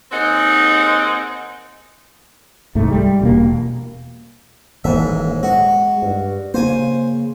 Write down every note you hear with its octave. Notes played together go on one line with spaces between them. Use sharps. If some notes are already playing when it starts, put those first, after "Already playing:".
D#2 C4 D#4 G#4 D#5 F#5
C2 G#2 A3
G3
E1 B2 A#3
D#1 G#2 E3 A#3 E5
G#3 F#4
G2
C#3 A#3 C5 G#5